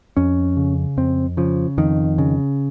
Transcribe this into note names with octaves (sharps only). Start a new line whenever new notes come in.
F2 C#4
C#3
F2 C4
C#3 F3
F2 D#3
C#3